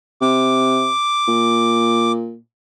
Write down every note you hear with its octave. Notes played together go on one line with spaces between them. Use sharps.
C3 D6
A#2